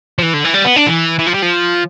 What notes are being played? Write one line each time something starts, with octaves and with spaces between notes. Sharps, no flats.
F3
E3
D3
E3
G3
B3
D4
E3
E3
F3
G3
F3